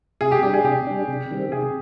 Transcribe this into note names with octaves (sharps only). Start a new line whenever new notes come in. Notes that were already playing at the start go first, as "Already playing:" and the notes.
C3 G#4
G4
G3 D4 G4
G#4
C3 G4
G3 D4
C3
D#3 G3 C4
C3 G#4